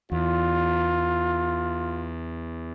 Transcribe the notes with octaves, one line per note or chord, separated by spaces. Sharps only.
E2 F4